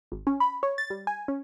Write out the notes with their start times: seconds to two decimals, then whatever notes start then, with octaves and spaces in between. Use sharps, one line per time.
0.12 G#1
0.27 C#4
0.40 B5
0.63 C#5
0.78 A6
0.90 G3
1.07 G#5
1.28 C#4